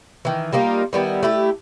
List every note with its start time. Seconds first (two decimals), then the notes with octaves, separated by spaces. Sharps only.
0.25 D#3 E3
0.52 G3 A#3 D#4 F4
0.93 D#3 G3 B3 E4
1.23 A3 E4 G4